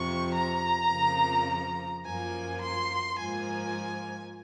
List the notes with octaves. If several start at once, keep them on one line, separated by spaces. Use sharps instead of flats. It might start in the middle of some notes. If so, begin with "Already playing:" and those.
Already playing: F2 C3 F3 C#6
A#5
F2 C#3 F3 A#3
F#2 F3 A#3 G#5
C6
G#2 F3 A#3 G#5